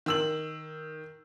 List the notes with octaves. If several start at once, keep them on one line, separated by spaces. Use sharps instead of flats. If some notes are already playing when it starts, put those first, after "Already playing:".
D#3 E6 F#7